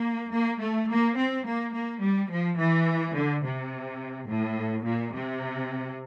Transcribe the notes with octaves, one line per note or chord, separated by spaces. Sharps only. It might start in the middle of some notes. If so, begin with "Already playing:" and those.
Already playing: A#3
A#3
A3
A#3
C4
A#3
A#3
G3
F3
E3
D3
C3
A2
A#2
C3